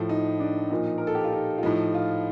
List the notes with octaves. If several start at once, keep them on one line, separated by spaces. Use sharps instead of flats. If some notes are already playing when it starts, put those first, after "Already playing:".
Already playing: A2 F3
D#4
D4
A#2 F3 D#4
A#4
A4
G4
F4
D#4
F4
A2 F3 D#4
F4